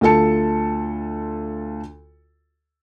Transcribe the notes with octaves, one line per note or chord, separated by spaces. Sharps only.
D2 F4 A4 A5 C#7